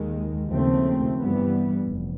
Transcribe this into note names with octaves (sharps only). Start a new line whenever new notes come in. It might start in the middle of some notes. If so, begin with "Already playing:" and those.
Already playing: D#2 D#3 G#3
D#2 C#3 F3 A3 C4
G2 E3 G3 B3
F1